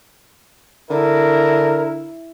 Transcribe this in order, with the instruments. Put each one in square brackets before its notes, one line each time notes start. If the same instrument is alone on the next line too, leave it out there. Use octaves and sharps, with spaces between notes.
[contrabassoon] D3 [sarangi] E4 [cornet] A#4